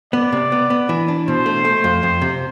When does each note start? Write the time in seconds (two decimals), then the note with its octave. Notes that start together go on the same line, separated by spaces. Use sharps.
0.13 B3 D5
0.32 C3
0.52 B3
0.70 B3
0.89 E3
1.08 D4
1.28 B2 C5
1.46 A3
1.65 A3
1.84 F2
2.03 F2
2.22 C3